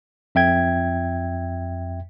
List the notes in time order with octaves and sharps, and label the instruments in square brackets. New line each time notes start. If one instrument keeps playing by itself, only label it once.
[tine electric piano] F2 E5 G5 G#6